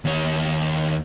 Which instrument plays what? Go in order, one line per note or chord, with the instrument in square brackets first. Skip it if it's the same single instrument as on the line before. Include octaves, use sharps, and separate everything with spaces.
[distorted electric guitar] D#2 C#5